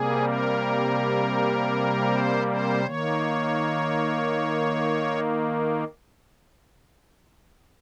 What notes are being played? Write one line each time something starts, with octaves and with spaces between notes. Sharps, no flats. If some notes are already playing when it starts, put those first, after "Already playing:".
Already playing: C3 G3 A#3 G#4
A#4
C5
C5
D#3 A#3 C#5